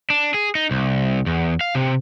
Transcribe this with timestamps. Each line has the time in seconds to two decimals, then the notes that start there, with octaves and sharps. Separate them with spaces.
0.10 D4
0.34 G#4
0.55 D#4
0.71 C2
1.26 E2
1.61 F5
1.75 C3